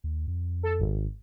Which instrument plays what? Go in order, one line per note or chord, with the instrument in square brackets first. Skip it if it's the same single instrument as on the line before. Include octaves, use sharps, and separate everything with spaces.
[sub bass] D#2
F2
[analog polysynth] A4
G#1